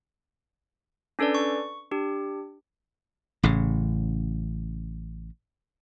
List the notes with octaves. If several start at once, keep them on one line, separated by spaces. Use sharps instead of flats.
C#4 D4 A4 B4 D5
C#6
D4 G4
A1 A2 C#3